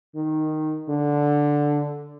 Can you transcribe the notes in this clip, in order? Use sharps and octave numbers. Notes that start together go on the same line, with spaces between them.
D#3
D3